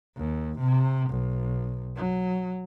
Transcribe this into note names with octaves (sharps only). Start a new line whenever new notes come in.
D#2
C3
B1
F#3